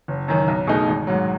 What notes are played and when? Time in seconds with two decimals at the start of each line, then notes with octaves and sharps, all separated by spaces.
0.08 F#1
0.28 F#2 D#3
0.48 B1
0.67 B2 A3 D#4 G#4
0.87 G#1
1.07 G#2 F#3